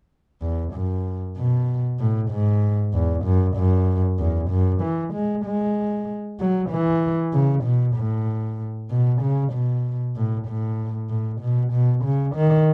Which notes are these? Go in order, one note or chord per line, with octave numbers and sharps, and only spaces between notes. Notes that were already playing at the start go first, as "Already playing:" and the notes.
E2
F#2
B2
A2
G#2
E2
F#2
F#2
E2
F#2
E3
G#3
G#3
F#3
E3
C#3
B2
A2
B2
C#3
B2
A2
A2
A2
B2
B2
C#3
D#3